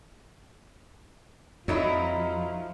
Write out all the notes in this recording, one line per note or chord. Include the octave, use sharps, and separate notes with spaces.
F2 F3 F#3 D#4 E4